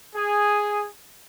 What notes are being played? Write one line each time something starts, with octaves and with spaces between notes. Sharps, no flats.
G#4